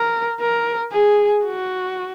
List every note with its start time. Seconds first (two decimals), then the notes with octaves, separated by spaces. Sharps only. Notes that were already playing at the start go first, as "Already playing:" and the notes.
Already playing: A#4
0.40 A#4
0.92 G#4
1.44 F#4